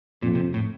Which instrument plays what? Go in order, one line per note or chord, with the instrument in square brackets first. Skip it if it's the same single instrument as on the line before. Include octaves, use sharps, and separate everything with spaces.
[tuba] F2 [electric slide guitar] A#2
[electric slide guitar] C3
A2